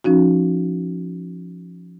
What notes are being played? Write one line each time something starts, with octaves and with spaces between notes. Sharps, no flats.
F3 C#4 D#4 F#4